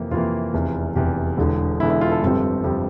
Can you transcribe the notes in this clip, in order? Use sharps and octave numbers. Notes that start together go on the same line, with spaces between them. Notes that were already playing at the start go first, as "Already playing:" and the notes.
Already playing: F2 C3 E3 A#3
F2 C3 E3 A#3 F4
F1 E2 C3
F1 E2 C3 G4
E1 E2 D3
E1 E2 D3 E4
E4
F4
A4
G1 F2 C3 G3 C4
G1 F2 C3 G3 C4